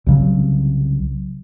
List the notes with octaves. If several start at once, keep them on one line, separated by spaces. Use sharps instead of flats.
C2 C#3 F#3